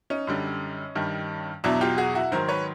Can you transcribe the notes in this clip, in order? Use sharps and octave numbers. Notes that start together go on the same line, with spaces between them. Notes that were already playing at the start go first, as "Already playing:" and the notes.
C#4 D#4
F#2 D3 G3
G2 D#3 G3
E2 B2 F#3 D4 E4
F4 G4
F#4 G#4
E4 F#4
G#2 D#3 F#3 A#4 C5
B4 C#5